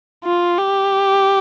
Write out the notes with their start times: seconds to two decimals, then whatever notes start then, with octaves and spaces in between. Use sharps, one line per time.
0.24 F4
0.58 G4